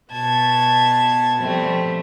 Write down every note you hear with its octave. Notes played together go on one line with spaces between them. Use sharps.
B2 B3 A5 G#6
B2 F3 G3 A3 C4